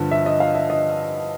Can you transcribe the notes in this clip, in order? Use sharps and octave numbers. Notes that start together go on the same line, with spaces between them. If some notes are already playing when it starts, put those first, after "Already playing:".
Already playing: G2 D3 F3
E5
D#5
F5
E5
D#5